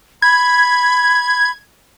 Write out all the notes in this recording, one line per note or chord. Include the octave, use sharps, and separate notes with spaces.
B5 G#6